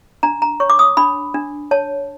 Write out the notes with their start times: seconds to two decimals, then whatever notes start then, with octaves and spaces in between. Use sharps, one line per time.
0.23 D4 A#5
0.42 A#5
0.60 C#5 C#6
0.70 D6
0.79 D#6
0.97 D4 B5
1.34 D4
1.71 C#5 A5